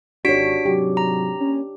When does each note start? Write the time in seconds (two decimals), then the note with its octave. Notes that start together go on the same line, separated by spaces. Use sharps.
0.25 G#1 D4 F#4 G4 C#5 B6 D7
0.66 G#2 C3 F#3 G4
0.97 A#5
1.40 A#3 C#4